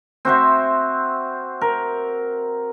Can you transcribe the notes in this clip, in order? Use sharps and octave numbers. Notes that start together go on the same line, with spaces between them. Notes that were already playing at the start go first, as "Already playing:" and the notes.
C4 F#4 C5 E5
A#4